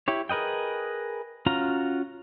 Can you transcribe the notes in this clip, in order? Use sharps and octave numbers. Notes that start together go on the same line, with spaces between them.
E4 G4 C#5
G#4 A#4 B4 D#5 G5
C#4 F4 F#4 A#5